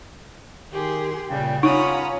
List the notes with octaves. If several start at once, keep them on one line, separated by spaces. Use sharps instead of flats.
D#3 G4 G#4 C6
A#2 C#3 G3 G5
C#4 D#4 F4 C#5 F#5 A#5 B5 D#6